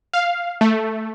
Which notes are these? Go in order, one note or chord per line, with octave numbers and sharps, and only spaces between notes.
F5
A3